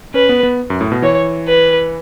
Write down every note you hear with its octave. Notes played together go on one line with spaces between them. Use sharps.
C#4 B4
B3
B3
F#2
A2
B2
E3 C#5
B4